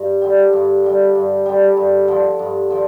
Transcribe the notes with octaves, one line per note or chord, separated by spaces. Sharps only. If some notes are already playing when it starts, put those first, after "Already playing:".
Already playing: G2
D3 G3
G2
D3 G3
G2
D3 G3
G2
D3 F3
G2
D3 F3